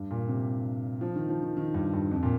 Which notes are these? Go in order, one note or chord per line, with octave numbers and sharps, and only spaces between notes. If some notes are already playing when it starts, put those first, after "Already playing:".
Already playing: G2
A#2
C3
F3
D#3
F3
D#3
D#3
G2
G2
F2
A#2